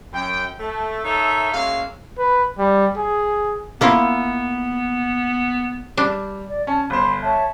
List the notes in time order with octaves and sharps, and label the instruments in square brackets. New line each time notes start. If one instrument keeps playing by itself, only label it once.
[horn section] F#2 G5
A3
D#4 A4 A#4 C#5 E5
G#3 A#3 C#4 F#4 E5 F5
[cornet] B4
G3
G#4
[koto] A#3 E4 F4 [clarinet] B3
[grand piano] G3 [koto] D4
[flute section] D5
[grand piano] C#4 [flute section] A5
[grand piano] G1 C5 [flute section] B5 C6
[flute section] C#5 E5 A5